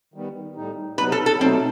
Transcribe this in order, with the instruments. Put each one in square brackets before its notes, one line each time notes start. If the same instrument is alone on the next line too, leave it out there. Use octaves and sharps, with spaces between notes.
[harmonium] D#3 G3 B3
A2 G3 D#4
[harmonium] C3 F#3 B3 D#4 [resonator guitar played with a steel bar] B4
[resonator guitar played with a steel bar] A4
A4
[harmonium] B2 F#3 A3 D#4 [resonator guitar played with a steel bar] C4